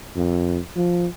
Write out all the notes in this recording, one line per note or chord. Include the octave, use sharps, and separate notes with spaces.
F2
F3